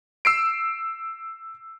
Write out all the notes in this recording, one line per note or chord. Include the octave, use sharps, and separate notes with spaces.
E6 C7 D7